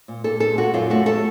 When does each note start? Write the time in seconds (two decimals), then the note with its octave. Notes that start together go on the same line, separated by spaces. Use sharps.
0.08 A#2
0.24 A#2 A4
0.40 A#2 A4
0.57 A#2 F#4
0.74 F#2 F4
0.90 A3 F#4
1.06 A3 A4